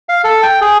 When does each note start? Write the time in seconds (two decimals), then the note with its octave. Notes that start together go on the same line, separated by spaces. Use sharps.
0.09 F5
0.24 A4
0.43 G5
0.61 G#4